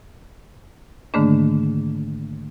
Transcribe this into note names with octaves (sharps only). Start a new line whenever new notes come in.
G#2 D3 D#3 A3 A#3 D4